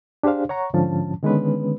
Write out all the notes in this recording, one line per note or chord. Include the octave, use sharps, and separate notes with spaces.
D4 G4 G#4 C5 F5
C#5 F#5 A#5 C#6
G#2 D3 F3 C#4 A5
D3 D#3 G#3 B3 C#4 B4